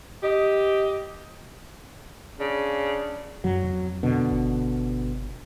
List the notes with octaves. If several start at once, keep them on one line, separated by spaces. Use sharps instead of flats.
G4 D#5
C#3 D4
F#2 F#3
F2
B2 D3
G1